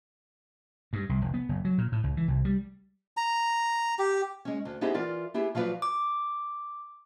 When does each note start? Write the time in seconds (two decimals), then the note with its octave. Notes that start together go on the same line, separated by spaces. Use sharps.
0.93 G2
1.09 C2
1.22 F1
1.34 B3
1.49 F#1
1.65 F#3
1.78 A#2
1.92 A2
2.04 C#2
2.17 E3
2.28 C2
2.45 G3
3.17 A#5
3.99 G4
4.45 G#3 C#4
4.65 D2
4.81 B3 D#4 E4 G4 G#4 C5
4.94 E3 F4 A#4 D5
5.34 B3 E4 G4 G#4
5.55 F3 F#3 F4 F#4 B4 D5
5.82 D6